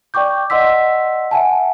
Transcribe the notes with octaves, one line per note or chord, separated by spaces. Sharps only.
D5 G5 C#6 D6 G6
D5 D#5 F#5 C6 E6 B6
E5 F#5 G#5 A5